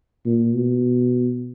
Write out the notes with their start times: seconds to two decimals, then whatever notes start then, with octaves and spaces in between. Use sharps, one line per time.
0.26 A#2
0.55 B2